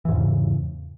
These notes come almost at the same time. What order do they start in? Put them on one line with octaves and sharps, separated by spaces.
E3 G#2 E2 C#3